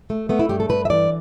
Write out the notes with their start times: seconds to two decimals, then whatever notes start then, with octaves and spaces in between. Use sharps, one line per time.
0.10 A3
0.29 A3 B3
0.39 E4
0.49 G2 G4
0.60 A4
0.69 G2 B4
0.85 E5
0.90 E3 D5